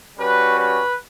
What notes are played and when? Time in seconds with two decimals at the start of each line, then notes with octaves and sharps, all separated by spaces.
0.18 G3 C#4 F#4 B4
0.58 B4